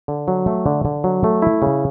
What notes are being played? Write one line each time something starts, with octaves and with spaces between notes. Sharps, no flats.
D3
F#3
A3
D3
D3
F#3
A3
E4
C#3